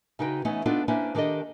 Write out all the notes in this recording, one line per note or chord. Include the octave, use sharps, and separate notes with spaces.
C#3 D#4 F#4 B4 G5
E3 A3 B3 C#4 D#4
B3 D4 D#4 F4 A4 B4
A#3 C#4 D4 E4 B4 C5
D#3 D4 G4 A4 D#5